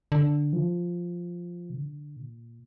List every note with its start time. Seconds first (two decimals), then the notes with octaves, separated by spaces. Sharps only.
0.12 D3
0.53 F3
1.70 C3
1.75 D3
2.16 A#2